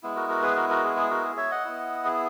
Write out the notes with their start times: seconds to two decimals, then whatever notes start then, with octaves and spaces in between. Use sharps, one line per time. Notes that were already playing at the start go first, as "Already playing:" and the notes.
0.03 G#3 B3 E4
0.16 F#4 A#4
0.29 F#4 A#4
0.42 G#4 B4
0.56 F#4 A#4
0.69 F#4 A#4
0.84 G#4
0.97 G#4
1.10 F#4 A#4
1.24 G#4
1.37 C#5 E5
1.51 D#5 F#5
1.65 B3 E4
2.05 G#4